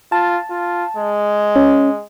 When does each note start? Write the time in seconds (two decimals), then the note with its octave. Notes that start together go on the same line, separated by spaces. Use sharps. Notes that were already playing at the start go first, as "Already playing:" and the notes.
0.12 F4 A5
0.51 F4
0.97 G#3
1.56 C#4